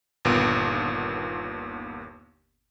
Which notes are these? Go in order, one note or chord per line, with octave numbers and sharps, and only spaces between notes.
G1 D#2 A#2 B3 D7